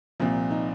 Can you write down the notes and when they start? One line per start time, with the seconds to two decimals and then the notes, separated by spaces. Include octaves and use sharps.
0.20 C2 A#2 F3
0.51 D#4